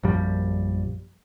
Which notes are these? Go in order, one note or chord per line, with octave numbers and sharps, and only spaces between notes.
A#1 F#2 F3 G3